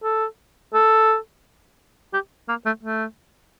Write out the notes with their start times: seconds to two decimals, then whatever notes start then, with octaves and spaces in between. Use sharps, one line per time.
0.04 A4
0.74 A4
2.13 G4
2.49 A#3
2.65 A3
2.83 A3